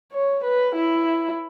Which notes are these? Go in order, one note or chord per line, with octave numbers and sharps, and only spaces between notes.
C#5
B4
E4